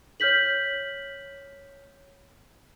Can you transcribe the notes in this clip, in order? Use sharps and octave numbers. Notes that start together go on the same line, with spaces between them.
C#5 F6 G6 B6 F#7